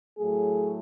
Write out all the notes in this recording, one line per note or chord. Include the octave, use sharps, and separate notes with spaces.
A2 F#3 A3 G#4